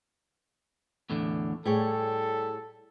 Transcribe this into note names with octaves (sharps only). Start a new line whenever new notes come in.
E2 A2 D3
A2 G3 G#4 A4 C#5